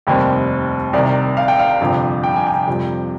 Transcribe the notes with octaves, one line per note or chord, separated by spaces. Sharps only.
F1 D#2 D#3 G3 C4
C2 C3 D#3 D5
F5
G5
F5
G1 F2 C3
G5
G#5
G5
F2 C3 G3